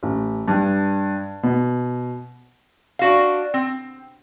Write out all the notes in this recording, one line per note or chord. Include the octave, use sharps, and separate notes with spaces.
A1
G2
B2
D4 F#4 F5
C4